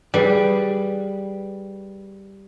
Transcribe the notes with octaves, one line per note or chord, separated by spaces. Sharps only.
G3 G#4 B4 D5